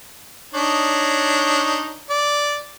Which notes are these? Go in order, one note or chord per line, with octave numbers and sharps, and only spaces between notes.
D4 D#4 C#5
D5